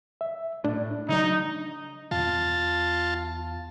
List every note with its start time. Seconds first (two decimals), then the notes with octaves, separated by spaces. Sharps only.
0.21 E5
0.64 A2 D4
1.09 C#3 F#3 D#4
2.11 E2 F4 A5